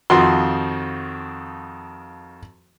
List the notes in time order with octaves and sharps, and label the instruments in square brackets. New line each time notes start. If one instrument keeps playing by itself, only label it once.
[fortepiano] F2 D#3 F3 F#4 C6